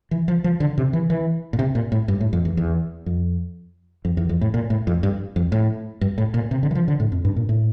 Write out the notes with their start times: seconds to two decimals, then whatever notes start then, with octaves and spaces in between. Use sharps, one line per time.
0.11 E3
0.28 F3
0.44 F3
0.60 D3
0.78 C3
0.93 E3
1.10 E3
1.53 A#2
1.59 C3
1.75 A#2
1.92 A2
2.08 G2
2.21 A2
2.33 F2
2.45 E2
2.57 E2
3.06 F2
4.05 F2
4.17 E2
4.29 F2
4.41 A2
4.54 A#2
4.70 A2
4.87 F2
5.03 G2
5.36 F2
5.52 A2
6.01 G2
6.18 A2
6.34 A#2
6.51 C3
6.63 D3
6.71 E3
6.75 F3
6.88 D3
7.00 A2
7.12 F2
7.25 G2
7.36 A#2
7.49 A2